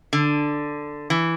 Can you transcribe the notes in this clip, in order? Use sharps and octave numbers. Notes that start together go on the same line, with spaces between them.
D3
E3